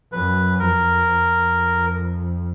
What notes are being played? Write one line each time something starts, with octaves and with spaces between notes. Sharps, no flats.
F#2 B4
F2 A#4
F2